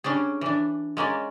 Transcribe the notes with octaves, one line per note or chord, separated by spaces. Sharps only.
G3 C#4 D4 G#4
E3 D4
G#3 A#3 C#4 D5